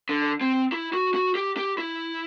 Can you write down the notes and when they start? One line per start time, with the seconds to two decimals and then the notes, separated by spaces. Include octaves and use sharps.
0.09 D3
0.41 C4
0.72 E4
0.93 F#4
1.14 F#4
1.35 G4
1.57 G4
1.78 E4